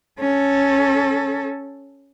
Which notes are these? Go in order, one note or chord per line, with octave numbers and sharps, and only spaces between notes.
C#4 A4